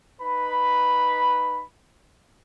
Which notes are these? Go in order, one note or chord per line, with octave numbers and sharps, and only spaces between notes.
D#4 B4 B5